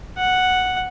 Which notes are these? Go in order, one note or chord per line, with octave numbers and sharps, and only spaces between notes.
F#5